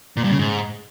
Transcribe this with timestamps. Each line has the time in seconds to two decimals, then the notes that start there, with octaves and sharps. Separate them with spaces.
0.17 A#2
0.24 G2
0.32 C#3
0.39 G#2